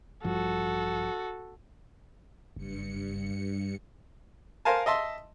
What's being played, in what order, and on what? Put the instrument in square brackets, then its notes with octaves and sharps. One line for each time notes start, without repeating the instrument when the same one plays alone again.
[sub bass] A1 [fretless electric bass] G2 F3 [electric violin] F#4 A4
[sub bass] F#1 [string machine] G2 C#7
[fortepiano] A#4 C5 F5 G#5 A5
D#5 E5 A5 C6